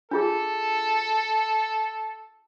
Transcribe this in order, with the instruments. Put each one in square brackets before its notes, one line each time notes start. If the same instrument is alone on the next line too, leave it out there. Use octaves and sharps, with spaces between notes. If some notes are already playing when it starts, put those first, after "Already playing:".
[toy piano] D4 F4 G#4 [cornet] A4